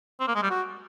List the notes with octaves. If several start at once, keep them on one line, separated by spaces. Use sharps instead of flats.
C4
A#3
G#3
G3
F#4